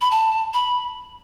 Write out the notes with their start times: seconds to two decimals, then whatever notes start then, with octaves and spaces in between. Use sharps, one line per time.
0.01 B5
0.11 A5
0.54 B5